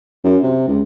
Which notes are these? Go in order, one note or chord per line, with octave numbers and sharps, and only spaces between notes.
F#2
C3
C#2